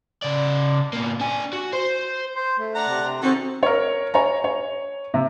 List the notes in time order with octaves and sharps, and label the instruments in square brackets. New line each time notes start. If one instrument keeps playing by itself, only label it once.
[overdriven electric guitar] C#3 D5
B2 A#3
D4 G#5
F#4
C5
[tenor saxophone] C5
A3
[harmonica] D4 F#5 A#5
[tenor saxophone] C3
C3
[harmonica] D#3 A4 [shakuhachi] C4 [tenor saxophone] F#4
[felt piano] A#4 C#5
C#5 G#5 A#5
C#5
C3